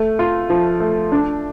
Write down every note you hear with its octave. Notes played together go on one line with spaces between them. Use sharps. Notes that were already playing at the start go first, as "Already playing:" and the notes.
Already playing: A3
F4
F3
A3
D4